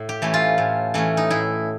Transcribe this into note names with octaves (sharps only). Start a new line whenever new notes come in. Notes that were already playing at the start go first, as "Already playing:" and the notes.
Already playing: A2
G4
E3 A3 C#4
F4
A2
E3 A3 C#4
D#4
A2 E4